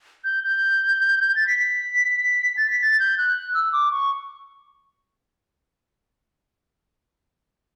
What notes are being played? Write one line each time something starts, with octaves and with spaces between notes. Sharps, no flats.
G6
G6
A6
B6
B6
A6
B6
A6
G6
F#6
E6
D6
C#6